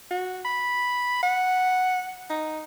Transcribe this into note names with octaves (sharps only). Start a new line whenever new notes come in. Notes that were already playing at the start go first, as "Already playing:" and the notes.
F#4
B5
F#5
D#4